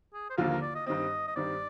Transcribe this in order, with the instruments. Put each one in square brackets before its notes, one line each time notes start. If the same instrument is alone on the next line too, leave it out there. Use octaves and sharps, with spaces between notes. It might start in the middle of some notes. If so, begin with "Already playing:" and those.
[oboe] G#4
C5
[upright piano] D#2 D3 F3 A#3 F4 [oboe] A#4
[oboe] A#4
D5
D#5
[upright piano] G2 D#3 G3 C4 [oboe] D#5
[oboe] D#5
[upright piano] G2 D#3 G3 C4 [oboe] D5